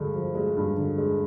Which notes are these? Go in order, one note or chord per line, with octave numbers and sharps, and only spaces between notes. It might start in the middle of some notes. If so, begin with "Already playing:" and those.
Already playing: G2 D3 G#3
F3
G#3
G2
D3
G#3